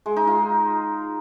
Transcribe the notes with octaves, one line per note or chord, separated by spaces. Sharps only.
G#3
D#4
F4